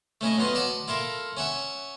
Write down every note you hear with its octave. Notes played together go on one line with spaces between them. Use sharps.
A3 C#4 E4 D#5
F#3 B3 F4 D#5 F5
D5 F#5 A5
E4 F4 A4 A#4
C#4 E5 F#5